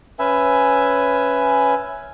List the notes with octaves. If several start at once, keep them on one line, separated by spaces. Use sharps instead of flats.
C#4 B4 E5 G#5